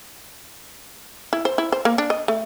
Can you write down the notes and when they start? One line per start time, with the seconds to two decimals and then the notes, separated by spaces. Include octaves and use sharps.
1.33 E4
1.45 C5
1.58 E4
1.72 C5
1.85 A#3
1.98 D4
2.10 D#5
2.28 A3